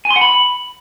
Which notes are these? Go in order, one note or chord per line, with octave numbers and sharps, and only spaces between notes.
G#5
C6
F#5
B5